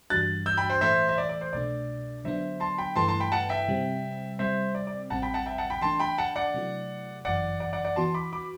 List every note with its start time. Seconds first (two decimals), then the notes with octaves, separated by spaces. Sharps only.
0.10 G2 E3 G3 D4 F#4 F#6 A6
0.46 E6 G6
0.57 G5 B5
0.70 C5
0.81 A2 E3 A3 C5 E5
1.09 E5
1.18 D5
1.29 D5
1.41 C5
1.53 C2 B2 A3 D4 D5
2.24 D3 F#3 B3 D4 C5 E5
2.60 A5 C6
2.78 G5 B5
2.96 G2 E3 A3 E4 B4 A5 C6
3.08 A5 C6
3.20 G5 B5
3.32 F#5 A5
3.49 E5 G5
3.68 C3 G3 C4
4.39 C3 G3 C4 C5 E5
4.75 D5
4.87 D5
5.10 A1 A2 G3 C4 F#5 A5
5.22 G5 B5
5.34 F#5 A5
5.46 E5 G5
5.58 F#5 A5
5.70 G5 B5
5.81 E3 A3 D4 A5 C6
6.00 G5 B5
6.18 F#5 A5
6.36 D5 F#5
6.54 C3 F#3 A3 E4
7.25 G1 F#2 E3 D5 F#5
7.60 D5 F#5
7.73 D5 F#5
7.85 D5 F#5
7.96 E3 B3 F#4 A5 C6
8.14 B5 D6
8.33 B5 D6